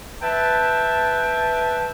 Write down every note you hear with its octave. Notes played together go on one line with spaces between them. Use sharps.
B4 E5 G5 A5